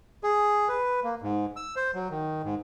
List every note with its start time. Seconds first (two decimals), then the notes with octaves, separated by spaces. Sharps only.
0.24 G#4
0.68 B4
1.04 A#3
1.22 G#2
1.57 E6
1.76 C5
1.94 F#3
2.10 D#3
2.44 G#2